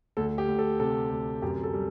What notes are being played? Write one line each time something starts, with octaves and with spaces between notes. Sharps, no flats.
D2 A4
G4
D2
A4
C3 A4
D2
F#2 G4
A4
G3